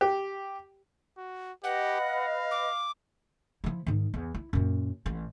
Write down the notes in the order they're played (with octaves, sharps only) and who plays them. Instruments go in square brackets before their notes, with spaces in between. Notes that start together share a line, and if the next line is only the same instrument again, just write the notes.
[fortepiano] G4
[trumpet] F#4
[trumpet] G4 [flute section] B4 D#5 [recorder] F#5
[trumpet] F5
[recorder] D6
[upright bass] F3 E4
G#2 D#3
E2
E4
F#2 A#2
A1